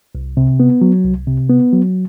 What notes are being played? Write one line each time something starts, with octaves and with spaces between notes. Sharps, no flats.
C2
C3
B3
F#3
C2
C3
B3
F#3